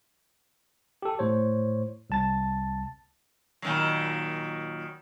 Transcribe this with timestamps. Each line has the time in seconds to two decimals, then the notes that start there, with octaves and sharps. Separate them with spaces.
1.02 G4 A4
1.19 A2 C5 C#5
2.10 C2 A5 A6
3.62 A#2 D#3 F#3